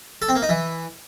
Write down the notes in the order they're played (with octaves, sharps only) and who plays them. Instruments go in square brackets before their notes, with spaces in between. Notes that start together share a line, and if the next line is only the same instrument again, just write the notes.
[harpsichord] A4
C4
A#3
D#4
E3